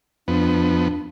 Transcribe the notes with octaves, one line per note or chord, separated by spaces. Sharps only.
F2 B3 D4